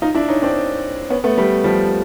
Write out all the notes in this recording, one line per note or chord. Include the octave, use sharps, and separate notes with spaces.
D#4 F4
D4 E4
C#4 D#4
C4 D4
B3 C#4
A3 B3
G3 A3
F3 G3